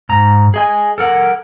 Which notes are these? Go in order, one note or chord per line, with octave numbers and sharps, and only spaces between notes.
G#2 A#5
G#4 D#5 G#5
A4 A#4 F#5